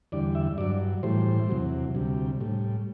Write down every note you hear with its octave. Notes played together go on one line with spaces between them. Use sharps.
E2 D3 G3 D5
E5
G2 F#3 D5
A2 E3 G3 C5
E2 C3 F#3
D2 C3 G3
A2 G3